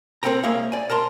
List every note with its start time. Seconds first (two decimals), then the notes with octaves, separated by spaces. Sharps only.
0.23 C4 C#4 A4 A#4 G5 A#5
0.43 C2 G#3 A#3 C#4 E5 F5
0.72 D5 G#5
0.90 A#4 A5 A#5 C6